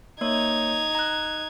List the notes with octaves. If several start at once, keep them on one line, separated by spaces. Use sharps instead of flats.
A#3 D#4 C#5 G#6
A#5 F#6